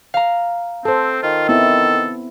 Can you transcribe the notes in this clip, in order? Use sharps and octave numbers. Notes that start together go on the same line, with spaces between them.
F5 A#5
C4 A4 C5
D#3 F4
B3 C4 E4 A4